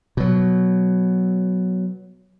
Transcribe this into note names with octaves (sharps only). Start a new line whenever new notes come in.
B2 F#3